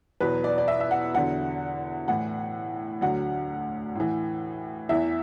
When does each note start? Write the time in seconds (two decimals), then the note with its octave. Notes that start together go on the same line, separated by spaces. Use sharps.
0.21 E2 B2 F#3 B4
0.44 D5
0.58 D5
0.68 E5
0.80 E5
0.91 F#5
1.15 E2 D3 F#3 F#5
2.08 A2 E3 F#5
3.01 D2 D3 F#3 F#5
3.95 A2 E3
4.89 E2 E3 E5